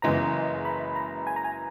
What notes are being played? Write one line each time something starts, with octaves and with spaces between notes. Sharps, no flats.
F#1 F#2 E3 G#3 B3 A#5
B5
A#5
G#5
A#5
G#5